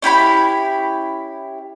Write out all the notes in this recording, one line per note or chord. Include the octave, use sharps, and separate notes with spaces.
C#4 E4 G4 B5